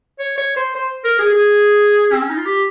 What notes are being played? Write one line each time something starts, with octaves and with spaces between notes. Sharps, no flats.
C#5
C#5
C5
C5
A#4
G#4
G#4
C4
C#4
D#4
F4
G4